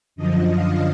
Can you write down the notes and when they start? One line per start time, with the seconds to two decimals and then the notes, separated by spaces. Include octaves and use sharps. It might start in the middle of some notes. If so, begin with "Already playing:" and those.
0.16 F#2 D3 F3 D#5
0.51 F5